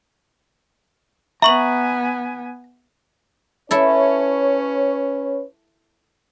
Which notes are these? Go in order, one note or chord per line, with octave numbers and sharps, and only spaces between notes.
B3 E5 G#5 A#5 C#6 F#7
C#4 E4 A4 B4 C#5